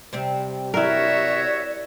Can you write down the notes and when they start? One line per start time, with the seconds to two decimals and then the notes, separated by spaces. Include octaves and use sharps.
0.13 C3 G3 C4
0.74 E4 F#4 A#4 C#5 D5 E5